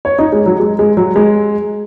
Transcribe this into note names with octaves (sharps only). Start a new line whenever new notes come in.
C#5
D#4
G#3
F#3
G#3
G#3
F#3
G#3